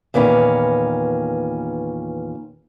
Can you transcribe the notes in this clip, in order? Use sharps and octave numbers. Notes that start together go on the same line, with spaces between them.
E2 A#2 D#3 C#4 B4